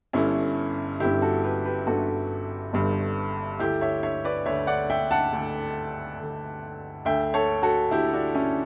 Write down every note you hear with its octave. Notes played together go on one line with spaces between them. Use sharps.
G1 G2 D3 C#4 E4
G1 G2 D3 E4 G4
F#4 A4
G4 B4
G4 B4
G1 G2 D3 F#4 A4
G1 G2 D3
D2 D3 E4 G4
C#5 E5
C#5 E5
B4 D5
D2 D3 C#5 E5
D5 F#5
E5 G5
F#5 A5
D2 D3
D2 D3
D2 D3 E5 G5
A4 C#5
F#4 A4
D2 D3 E4 G4
D4 F#4
C#4 E4